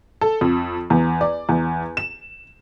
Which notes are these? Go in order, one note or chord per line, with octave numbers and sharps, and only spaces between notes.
A4
F2
E2
D5
E2
E7